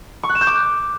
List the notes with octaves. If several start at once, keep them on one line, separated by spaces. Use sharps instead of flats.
C#6
F#6
E7
G6
D6